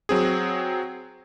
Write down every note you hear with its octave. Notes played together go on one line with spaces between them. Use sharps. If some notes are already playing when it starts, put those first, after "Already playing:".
F#3 C4 G#4